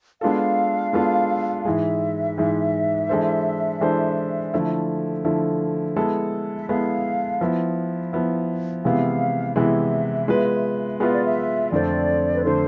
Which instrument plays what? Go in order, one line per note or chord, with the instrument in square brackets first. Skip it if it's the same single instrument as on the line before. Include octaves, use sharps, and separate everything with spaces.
[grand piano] G#3 B3 D4 F4 A4 [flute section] F5
[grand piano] G#3 B3 D4 F4 A4
[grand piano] G#2 E3 G#3 [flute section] E5
[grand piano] G#2 E3 G#3
E3 G#3 D4 A4 C5
E3 G#3 D4 A4 C5
D3 F3 A3 E4
D3 F3 A3 E4
G#3 B3 E4 A4
[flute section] E5
[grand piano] G#3 B3 E4 A4 [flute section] F5
[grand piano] F3 B3 E4
F3 B3 E4
[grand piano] C3 E3 G#3 B3 E4 [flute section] F5
[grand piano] C3 E3 G#3 B3 E4 [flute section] E5
[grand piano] G#3 B3 F4 B4
[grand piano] G#3 B3 F4 B4 [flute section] E5
[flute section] D5
E5
[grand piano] F2 D3 A3 C4 [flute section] D5
[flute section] B4
[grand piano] D3 A3 C4 [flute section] C5